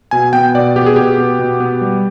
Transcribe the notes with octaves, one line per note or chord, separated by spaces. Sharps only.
B2 G#5
B3 G5
B2 D5
B3 G4
G#4
B2 G4
B3
B2
B3
G3